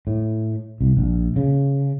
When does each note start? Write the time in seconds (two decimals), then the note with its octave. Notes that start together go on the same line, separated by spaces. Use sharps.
0.07 A2
0.81 C2
0.97 A#1
1.36 C#3